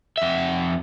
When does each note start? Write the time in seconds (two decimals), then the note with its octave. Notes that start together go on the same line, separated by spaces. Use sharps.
0.18 F2 E5